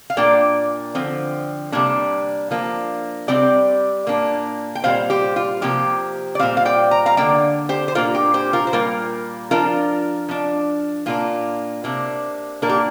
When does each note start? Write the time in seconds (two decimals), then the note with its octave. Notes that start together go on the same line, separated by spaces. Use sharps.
0.10 F5
0.17 A#2 A#3 D4 D5 G5
0.95 D3 F3 C4
1.72 C3 G3 A#3 D4
2.51 F3 A#3 D4
3.28 C3 G3 C4 D5 G5
4.07 A#2 A#3 D4
4.75 G5
4.84 A#2 G3 C4 C5 F5
5.10 G4 C5
5.36 F4
5.62 C3 F3 A#3 G4
6.35 D5
6.39 A#2 G3 C4 C5 F5
6.57 F5
6.65 D5 G5
6.91 A#5
7.06 F5 A#5
7.17 D3 A#3 D4 D5 G5
7.69 G4 C5
7.88 C5
7.95 A#2 A#3 D4 F4 A#4
8.15 G4
8.34 G4 C5
8.53 F4 A#4
8.67 C5
8.73 A#2 G3 A#3 F4 A#4
9.51 F3 D4 F4 A#4
10.29 F3 D4
11.06 A#2 A#3 D4 F4
11.84 C3 A#3 D4
12.62 A#2 A#3 D4 A#4
12.69 G4